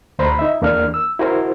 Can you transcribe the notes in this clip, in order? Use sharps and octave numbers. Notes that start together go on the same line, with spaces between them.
D2 C5 A#5 B5
D#4 E5
E2 A#3 D4 A#4 F6
E6
E4 F#4 A#4 C5